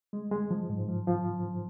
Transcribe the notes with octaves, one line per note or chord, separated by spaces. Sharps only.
G#3
G#3
F3
G#2
F3
F3